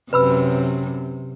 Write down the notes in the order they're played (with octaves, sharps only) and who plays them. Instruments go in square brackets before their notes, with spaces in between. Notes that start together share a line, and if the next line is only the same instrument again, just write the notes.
[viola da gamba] F#2 C3 [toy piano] B4 B5 E6